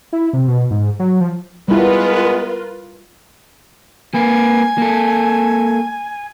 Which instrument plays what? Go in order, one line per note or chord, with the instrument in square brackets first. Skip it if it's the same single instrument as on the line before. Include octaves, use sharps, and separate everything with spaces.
[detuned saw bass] E4
C3
B2
G#2
F#3
F3
[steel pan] G3 E4 [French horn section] G#3 B3 [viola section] F4 A#4 B4
[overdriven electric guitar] A#3 B4 [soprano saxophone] G#5
[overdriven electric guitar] A#3 A4